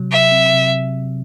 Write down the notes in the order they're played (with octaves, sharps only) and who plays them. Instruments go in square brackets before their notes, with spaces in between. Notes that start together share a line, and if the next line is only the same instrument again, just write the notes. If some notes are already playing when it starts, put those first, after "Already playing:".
Already playing: [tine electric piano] C3 F#3
[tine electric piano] C3 [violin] E5
[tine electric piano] C4
C3